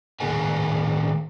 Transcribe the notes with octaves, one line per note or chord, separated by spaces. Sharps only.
A2 D#3 B3 G#4 B4 G#5